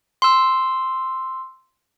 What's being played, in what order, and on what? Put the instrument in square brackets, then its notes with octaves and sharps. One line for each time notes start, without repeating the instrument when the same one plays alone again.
[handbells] C6 E6